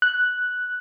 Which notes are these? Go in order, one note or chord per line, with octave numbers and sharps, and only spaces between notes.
F#6